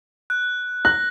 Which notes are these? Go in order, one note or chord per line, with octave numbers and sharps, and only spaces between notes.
F#6
F#6 A#6